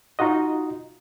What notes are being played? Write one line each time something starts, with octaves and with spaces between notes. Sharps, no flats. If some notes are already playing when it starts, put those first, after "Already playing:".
D#4 F4 F#4 D#5